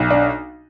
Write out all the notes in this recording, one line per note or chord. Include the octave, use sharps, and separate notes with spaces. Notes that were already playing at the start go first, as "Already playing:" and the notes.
Already playing: B1
D4